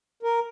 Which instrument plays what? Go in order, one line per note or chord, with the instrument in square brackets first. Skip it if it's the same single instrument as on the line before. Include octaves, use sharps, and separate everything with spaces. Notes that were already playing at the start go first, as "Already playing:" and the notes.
[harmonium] A#4